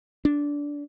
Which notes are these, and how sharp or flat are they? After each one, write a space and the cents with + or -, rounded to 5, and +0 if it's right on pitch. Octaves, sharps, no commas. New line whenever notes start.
D4 -15